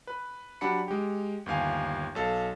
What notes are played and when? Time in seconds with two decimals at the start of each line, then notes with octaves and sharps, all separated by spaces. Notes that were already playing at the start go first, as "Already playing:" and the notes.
0.07 B4
0.61 F#3 D4 G4 F#5 B5 C#7
0.88 G#3 G4
1.46 G1 D#2 F5 G#5
2.15 B1 A4 F5